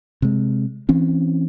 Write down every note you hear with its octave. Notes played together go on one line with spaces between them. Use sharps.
C3 G#3
E3 C4 C#4